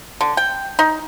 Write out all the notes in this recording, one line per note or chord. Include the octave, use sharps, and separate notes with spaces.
D3
G5
D#4